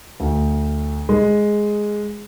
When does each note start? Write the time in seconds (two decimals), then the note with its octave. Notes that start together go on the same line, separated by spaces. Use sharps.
0.20 D2
1.09 G#3